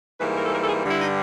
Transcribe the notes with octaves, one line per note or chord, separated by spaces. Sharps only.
G#2 E3 G3 A#3 B4
A#4
A4
A#4
A4
G#4
G2 D3 G3 E4
D#4